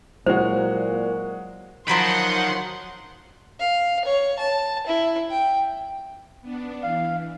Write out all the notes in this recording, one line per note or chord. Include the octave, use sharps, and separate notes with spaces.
A#2 F#3 G#3 E4 F#4 C5
D#3 F3 F#3 F#5 B5 C6
F5
C#5
A5
E4
G5
B3 D4
E3 F5